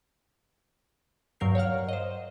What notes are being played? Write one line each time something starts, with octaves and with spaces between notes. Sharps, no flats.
G2 F#3 A#4 G6 C7
C#5 F5 F#5 F6
C5 D#5